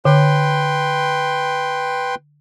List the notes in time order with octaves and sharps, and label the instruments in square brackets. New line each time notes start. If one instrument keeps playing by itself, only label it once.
[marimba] D3 [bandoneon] B4 G5 C6